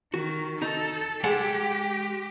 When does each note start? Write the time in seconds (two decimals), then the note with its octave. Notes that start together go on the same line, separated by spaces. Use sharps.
0.14 D#3 F#4
0.62 D#4 A4
1.24 G#3 G4 A4 F#5